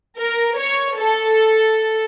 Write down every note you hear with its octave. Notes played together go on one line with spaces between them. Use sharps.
A#4
C#5
A4